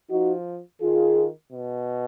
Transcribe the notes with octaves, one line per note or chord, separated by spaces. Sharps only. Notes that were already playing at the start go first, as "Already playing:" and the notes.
F3 D#4 F#4
D#3 F4 G#4
B2